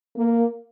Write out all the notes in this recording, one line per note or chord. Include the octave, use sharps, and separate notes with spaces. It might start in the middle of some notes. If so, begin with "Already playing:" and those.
A#3